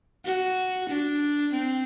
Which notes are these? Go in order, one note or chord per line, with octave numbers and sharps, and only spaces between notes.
F#4
D4
C4